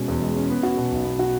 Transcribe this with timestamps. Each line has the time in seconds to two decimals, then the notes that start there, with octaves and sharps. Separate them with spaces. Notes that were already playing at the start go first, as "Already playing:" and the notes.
Already playing: B2 G#3 C#4
0.08 E2
0.22 G#3
0.36 C#4
0.50 B3
0.63 F#4
0.77 B2
0.92 B1
1.05 B3
1.19 F#4